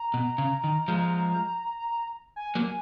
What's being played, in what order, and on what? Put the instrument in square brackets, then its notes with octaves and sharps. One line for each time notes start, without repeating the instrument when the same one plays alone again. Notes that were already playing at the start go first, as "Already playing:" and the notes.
Already playing: [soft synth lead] A#5
[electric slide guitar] B2
C#3
D#3
F3 G#3
[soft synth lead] G#5
[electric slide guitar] F#3 A#3